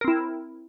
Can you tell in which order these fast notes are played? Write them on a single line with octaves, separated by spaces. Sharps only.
A#4 C4 E4